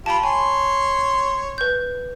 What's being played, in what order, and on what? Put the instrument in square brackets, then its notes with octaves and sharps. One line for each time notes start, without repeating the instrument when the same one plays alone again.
[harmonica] F4 G4 [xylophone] A5 B5
[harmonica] C#5 C6 [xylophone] G#5
[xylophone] B4 G6